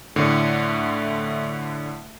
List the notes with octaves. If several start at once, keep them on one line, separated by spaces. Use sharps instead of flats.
A2 D3 A3